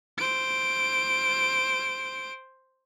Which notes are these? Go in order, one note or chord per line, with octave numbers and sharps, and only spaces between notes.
C5 D7